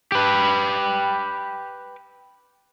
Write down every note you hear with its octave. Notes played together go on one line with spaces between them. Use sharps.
G4 B4